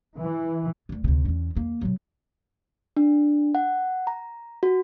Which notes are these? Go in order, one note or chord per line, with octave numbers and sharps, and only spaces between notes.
E3
D2 D3
D2 C3
E2 C#4
E2 A#3
C3 F#3
D4
F#5
A#5
F#4